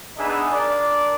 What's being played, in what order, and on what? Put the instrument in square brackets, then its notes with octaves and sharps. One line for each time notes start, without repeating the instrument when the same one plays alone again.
[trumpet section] B3 D4 D#4 G#4 E5
D4 A#4 D5